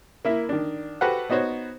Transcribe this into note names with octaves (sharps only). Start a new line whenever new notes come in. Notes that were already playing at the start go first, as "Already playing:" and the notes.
A#3 E4 E5
D#3 D4
F#4 G4 A4 B4 C5 F#5
B3 D#4 F#4 C5 C#5